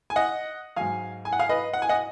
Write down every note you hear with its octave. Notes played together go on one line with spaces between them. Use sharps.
G#5
D#5 F#5
G#2 F#3 F5 G#5
G#5
F#5
F5 G#5
B4 D#5
F#5
G#5
D#5 F#5